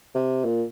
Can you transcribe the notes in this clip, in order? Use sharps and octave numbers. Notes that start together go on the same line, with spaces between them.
C3
A#2